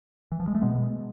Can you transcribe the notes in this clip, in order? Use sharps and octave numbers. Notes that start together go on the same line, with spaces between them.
E3
F3
G#3
A3
B2 G#3 B3